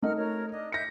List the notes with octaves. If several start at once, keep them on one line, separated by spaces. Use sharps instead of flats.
A3 D#4 A#4 D#5 F#5 F6
F#4 A#4 C#5
D4 D#5
D#5 E5 G6 A#6 C#7